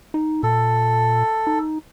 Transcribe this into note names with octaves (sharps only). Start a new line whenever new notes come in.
D#4
A#2 A4
D#4